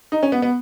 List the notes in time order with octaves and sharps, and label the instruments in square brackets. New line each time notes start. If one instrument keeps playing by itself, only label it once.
[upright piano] D#4
C#4
B3
B3